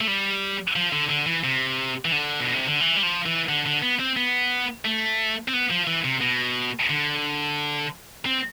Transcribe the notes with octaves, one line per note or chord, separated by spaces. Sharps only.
A3
G3
F3
D3
D3
E3
C3
E3
D3
B2
C3
D3
E3
G3
F3
E3
D3
D3
B3
C4
B3
A3
C4
B3
F3
E3
C3
B2
D3
C4